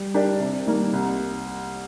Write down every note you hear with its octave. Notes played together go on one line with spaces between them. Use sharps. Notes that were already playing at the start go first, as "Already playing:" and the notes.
Already playing: G3
D4 G4 A#4 D5
C3
D#3 G3 A#3
C2